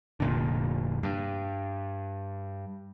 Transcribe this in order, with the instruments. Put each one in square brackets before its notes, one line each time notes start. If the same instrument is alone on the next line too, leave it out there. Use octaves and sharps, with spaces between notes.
[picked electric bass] F1 A#2 D3
G2